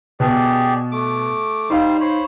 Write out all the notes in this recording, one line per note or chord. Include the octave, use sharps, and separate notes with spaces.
B2 B3 G4 G#4 D5
A3 D6
G3 D#4 C5 F5
C5 C#5 B5